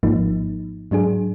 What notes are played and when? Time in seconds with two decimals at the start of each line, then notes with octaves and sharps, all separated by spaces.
0.03 G#1 G#2 F3 A#3 D#4
0.91 G#2 F#3 D4 G#4